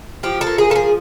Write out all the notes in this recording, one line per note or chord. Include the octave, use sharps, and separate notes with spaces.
F3 G4
A4
A#3
G#4
F3 A4
G#4